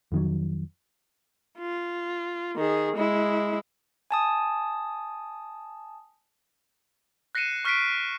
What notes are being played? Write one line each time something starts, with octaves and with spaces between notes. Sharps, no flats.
F2 D#3 F#3
F4
D#3 G#4
G#3 E4
G#5 A5 D#6
F#6 A#6 C7 C#7 D#7 E7
C#6 F6 F#6 B6 C7 D7